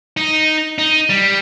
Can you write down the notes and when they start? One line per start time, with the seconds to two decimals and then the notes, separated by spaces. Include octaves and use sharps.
0.17 D#4
0.78 D#4
1.10 G3